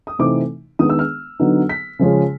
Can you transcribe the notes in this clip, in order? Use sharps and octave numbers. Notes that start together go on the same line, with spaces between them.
D#6
C3 E3 A3 C4 D#4 D6
D#3 G#3 B3 D4 D#6
E6
F6
D3 F#3 B3 D#4
B6
C#3 F3 G#3 C#4